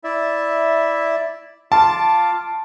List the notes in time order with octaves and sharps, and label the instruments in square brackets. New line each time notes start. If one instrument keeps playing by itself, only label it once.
[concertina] E4 D5 E5
[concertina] F4 F5 D6 [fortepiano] A5